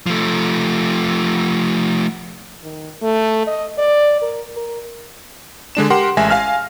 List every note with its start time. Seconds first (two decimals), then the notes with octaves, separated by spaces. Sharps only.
0.06 F3 A3
2.64 D#3
3.03 A3
3.47 D#5
3.78 D5
4.22 A#4
4.57 A#4
5.75 D3 G#3 D4 E7
5.90 G4 A#4 F#5 C6
6.17 A1 G#3 E5 G#5 A#6
6.30 F5 G#5 F6